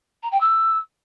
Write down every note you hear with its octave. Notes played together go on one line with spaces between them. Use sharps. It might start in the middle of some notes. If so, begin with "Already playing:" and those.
A#5
G5
E6